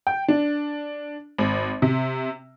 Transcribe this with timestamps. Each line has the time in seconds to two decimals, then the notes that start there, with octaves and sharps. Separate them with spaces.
0.07 G5
0.28 D4
1.38 G#1
1.82 C3